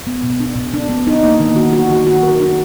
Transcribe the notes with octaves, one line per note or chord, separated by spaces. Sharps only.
B3
B2
D4
B2
D4
B3
D#4
A#3
D#3
F#4
F#4
D#3
F#4
A#4
D4